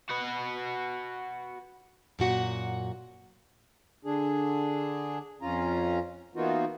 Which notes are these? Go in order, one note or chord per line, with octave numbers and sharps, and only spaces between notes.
F#4 B4
F#2 A#2 F#4 F#5
D3 D4 G#4
F2 C#4 F4 A#5
E3 A#3 B3 D#4 F4 F#4